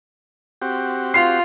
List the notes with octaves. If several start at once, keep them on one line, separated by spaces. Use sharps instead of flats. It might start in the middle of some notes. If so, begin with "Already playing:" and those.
C4 F#4 G4
F4 C7